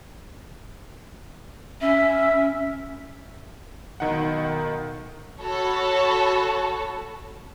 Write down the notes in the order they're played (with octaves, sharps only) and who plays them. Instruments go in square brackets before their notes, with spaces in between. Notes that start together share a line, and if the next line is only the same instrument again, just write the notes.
[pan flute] C#4 [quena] E5
[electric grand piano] B1 D#3 D#4 F#5
[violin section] F#4 A4 C#5 B5